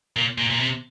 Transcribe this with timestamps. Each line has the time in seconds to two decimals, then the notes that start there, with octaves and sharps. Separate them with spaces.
0.16 A#2
0.38 A#2
0.50 A#2
0.59 C3